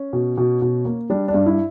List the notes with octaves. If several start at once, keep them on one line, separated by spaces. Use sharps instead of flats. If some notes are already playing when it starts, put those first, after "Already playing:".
Already playing: C#4
B2
B2
B2
A#3
G3 D4
D4
G2
E4